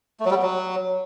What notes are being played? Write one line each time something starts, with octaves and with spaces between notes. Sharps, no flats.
A3
F#3
G3
B3
F#3